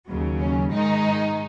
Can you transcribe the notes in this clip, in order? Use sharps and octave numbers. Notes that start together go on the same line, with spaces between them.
D#2 C#3 F#3
C#4
G#2 D#3 G#3 D#4